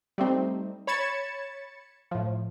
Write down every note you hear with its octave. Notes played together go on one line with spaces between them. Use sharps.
G3 A3 C4 D#4
C#5 B5 G#6 A6 C#7 E7
A2 F3